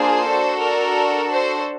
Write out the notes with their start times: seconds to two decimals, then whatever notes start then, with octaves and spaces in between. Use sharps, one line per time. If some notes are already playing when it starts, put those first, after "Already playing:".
Already playing: A#3 D4 F4 G#4 C5
0.27 D4 F#4 A4
0.61 A#4
1.31 C5